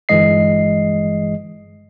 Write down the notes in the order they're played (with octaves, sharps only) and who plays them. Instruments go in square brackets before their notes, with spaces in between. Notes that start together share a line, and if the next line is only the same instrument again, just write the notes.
[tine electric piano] G1 G2 E3 G#3 D#5 C7